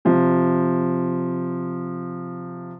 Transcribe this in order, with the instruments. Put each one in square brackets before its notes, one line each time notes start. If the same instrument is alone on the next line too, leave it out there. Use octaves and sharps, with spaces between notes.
[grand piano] C3 F3